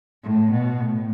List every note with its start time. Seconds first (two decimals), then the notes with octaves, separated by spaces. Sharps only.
0.23 A2
0.51 B2
0.80 A2